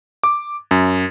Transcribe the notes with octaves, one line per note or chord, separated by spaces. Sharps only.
D6
F#2